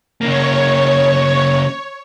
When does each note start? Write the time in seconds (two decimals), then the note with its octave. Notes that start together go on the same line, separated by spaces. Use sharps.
0.21 C#3 A#3 C#5